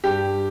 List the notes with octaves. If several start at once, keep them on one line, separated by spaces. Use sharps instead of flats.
G2 G4